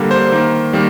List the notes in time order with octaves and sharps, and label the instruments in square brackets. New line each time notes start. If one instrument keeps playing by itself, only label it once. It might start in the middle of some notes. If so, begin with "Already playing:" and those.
Already playing: [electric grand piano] D3 G3 A#3
C5
D#3 A#3
D#3 G3 A#3